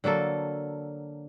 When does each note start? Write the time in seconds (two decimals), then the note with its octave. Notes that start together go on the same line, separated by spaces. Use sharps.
0.04 D3 F#3 A#3 A4